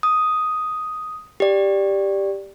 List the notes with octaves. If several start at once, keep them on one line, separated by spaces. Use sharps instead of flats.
D#6
G4 D5